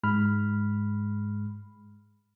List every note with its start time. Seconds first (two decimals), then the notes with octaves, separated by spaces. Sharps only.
0.03 G#2 G#3 B5 F6